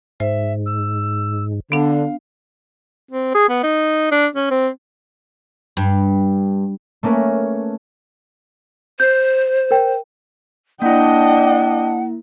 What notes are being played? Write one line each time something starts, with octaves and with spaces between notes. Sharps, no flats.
G#2 C5 E5
E6
D3 B3 D4 F5
C4
G#4
B3
D#4
D4
C#4
C4
G2
A3 A#3 C#4 A#4 B4
C5 G6 C7
A#4 G5
A#3 D4 E4 D#5 F#5 G5